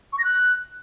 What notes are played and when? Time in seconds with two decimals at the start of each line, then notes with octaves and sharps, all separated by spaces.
0.12 C#6
0.18 A#6
0.24 F#6